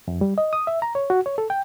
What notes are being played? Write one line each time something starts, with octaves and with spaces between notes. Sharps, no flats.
F2
G3
D#5
D#6
E5
A#5
C#5
F#4
C#5
A4
G5